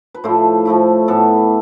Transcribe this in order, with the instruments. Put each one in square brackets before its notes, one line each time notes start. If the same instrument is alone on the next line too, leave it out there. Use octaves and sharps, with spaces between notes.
[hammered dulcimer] B4
A2 F3 A3 E4 C5
A2 F3 A3 E4
A2 E3 B3 A4